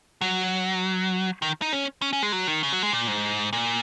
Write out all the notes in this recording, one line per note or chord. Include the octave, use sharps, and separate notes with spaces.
F#3
D#3
D#4
C#4
C#4
C#4
G#3
F#3
D#3
C#3
F#3
G#3
A#2
G#2
A#2